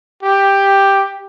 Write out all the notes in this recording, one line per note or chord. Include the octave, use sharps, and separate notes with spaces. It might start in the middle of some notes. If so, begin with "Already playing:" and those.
G4